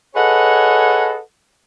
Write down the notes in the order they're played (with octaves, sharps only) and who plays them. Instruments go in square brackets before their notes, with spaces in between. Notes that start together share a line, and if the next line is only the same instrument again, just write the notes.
[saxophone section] G#4 A4 B4 C#5 D#5 F#5